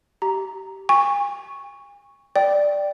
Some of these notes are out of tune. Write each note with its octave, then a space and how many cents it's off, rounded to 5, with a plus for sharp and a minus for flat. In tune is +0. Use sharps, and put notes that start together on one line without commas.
G4 -25 A#5 +0
G#5 -40 C#6 +0
D5 +0 G5 +0